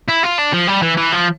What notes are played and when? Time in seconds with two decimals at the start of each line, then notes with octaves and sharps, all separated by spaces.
0.09 E4
0.24 F4
0.39 D4
0.54 F3
0.68 G3
0.83 E3
0.98 E3
1.12 F3